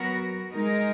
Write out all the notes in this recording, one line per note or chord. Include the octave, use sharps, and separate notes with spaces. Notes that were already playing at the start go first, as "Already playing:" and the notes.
Already playing: F#3 B3 F#4 A#4
G#3 D#4 A#4